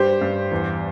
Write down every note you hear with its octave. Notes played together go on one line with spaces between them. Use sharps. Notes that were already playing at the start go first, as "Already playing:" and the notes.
Already playing: G2 G3 G4 C5
G2
E2